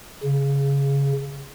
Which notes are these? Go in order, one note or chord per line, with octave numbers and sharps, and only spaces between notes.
C#3